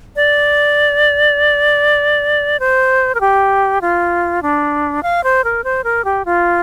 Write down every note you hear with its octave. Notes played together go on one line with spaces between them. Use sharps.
D5
C5
A#4
G4
F4
D4
F5
C5
A#4
C5
A#4
G4
F4